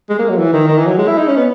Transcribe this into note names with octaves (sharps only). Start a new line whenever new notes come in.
G#3
A#3
F#3
E3
D#3
D#3
E3
F#3
G#3
E4
D#4
C#4
B3